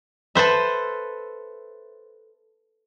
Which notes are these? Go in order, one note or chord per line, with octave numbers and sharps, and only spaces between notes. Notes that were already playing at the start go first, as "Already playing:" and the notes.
A4 B4 C5 E5